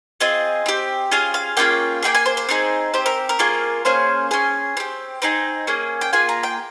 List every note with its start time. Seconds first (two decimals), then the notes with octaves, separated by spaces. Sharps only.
0.20 C4 F4 G#4 D#5
0.66 C4 G4
1.11 C#4 F4 G#4 F5
1.34 F5
1.57 A#3 C#4 F4 G#4 G5
2.03 A#3 D#4 G#4 G5
2.15 G#5
2.26 C5
2.37 C5
2.49 C4 D#4 G#4
2.94 C4 G4 C5
3.06 A#4
3.29 A#4
3.39 A#3 C#4 F4 G#4
3.85 A#3 C#4 G#4 C5
4.31 C#4 G#4 G#5
4.77 C4 G4
5.22 C4 D#4 G#4 A#5
5.67 A#3 C#4 G#4
6.01 G5
6.13 A#3 F4 G#4 G#5
6.29 A#5
6.43 G5